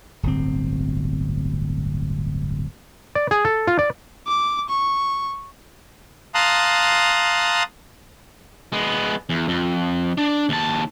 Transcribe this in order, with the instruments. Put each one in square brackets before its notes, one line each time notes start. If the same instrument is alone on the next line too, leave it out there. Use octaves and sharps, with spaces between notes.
[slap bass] D1 G1 C4
[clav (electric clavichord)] D5
G#4
A4
F4
D5
[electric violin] D6
C#6
[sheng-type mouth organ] F5 A5 A#5 C6 D#6 F#6
[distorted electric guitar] G#3 B3
E2
F2
D4
D#2 A5